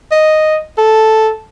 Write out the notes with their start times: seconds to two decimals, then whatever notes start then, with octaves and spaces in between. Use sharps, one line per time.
0.11 D#5
0.78 A4